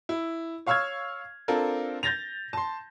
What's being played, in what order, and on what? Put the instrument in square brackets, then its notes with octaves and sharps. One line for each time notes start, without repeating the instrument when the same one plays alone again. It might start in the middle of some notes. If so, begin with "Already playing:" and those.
[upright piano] E4
C#5 F5 C#6 E6 F6 G#6
C4 D4 F4 A4 A#4
G6 A6 A#6 F7
A5 C6